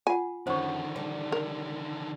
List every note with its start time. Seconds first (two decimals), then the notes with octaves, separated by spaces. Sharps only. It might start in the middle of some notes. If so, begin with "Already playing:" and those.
0.07 F4 F#5 G#5
0.47 F#2 D3 D#3 C5 C#6
0.96 G3 A5
1.32 A#4